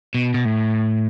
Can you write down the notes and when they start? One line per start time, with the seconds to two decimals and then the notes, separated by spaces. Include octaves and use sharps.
0.14 B2
0.34 B2
0.45 A2